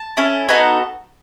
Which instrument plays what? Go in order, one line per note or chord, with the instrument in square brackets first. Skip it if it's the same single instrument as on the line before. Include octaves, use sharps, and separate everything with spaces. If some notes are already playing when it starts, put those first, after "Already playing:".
Already playing: [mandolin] A5
C#4 E4 A4
B3 D#4 F#4 A4 G#5